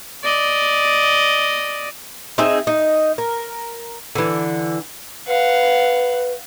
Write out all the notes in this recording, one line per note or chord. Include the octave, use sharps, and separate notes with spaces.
D5 D#5
C4 D#4 G#4 E5
D#4
A#4
D3 E3
B4 F5 F#5